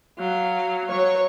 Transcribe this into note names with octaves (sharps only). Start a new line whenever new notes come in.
F#3 F5
F#3 C#5